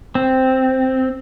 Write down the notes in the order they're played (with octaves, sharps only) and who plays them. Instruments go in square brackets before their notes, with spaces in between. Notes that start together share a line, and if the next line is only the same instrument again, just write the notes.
[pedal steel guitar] C4